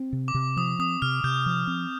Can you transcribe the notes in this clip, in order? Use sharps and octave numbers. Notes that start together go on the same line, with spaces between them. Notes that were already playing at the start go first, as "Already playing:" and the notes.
Already playing: C4
C3
D6
C3
F3 D#6
C4 D#6
C3 F6
C3 G6
F3
C4